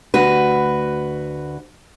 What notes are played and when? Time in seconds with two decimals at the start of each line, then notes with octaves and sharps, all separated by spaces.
0.14 D2 F#4 B4